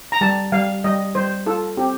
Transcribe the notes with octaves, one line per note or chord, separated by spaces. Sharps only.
A#5
G3 A5
G3 F5
G3 D#5
G3 C5
F4 A4
C4 G4